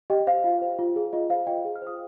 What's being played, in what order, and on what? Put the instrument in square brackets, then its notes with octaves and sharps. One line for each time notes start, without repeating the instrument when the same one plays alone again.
[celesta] G4 D#5 G5
C5 F5
F4
C5
F4
G#4
F4 D#5
C5 F5
F4 D#5 G5
G#4
F6
C5 D#6